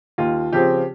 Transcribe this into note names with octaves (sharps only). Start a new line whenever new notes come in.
D#2 F4
C#3 F3 C4 G4